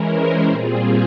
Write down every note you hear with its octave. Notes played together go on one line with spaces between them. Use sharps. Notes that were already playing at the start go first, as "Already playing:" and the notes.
Already playing: E3 G#3 C#4 E4 A#4
C5
A#2 G3 C4 F4 G#4